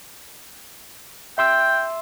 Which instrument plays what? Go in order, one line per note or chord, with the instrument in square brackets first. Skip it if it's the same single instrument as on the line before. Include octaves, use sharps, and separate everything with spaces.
[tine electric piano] E5 C6 E6 [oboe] G5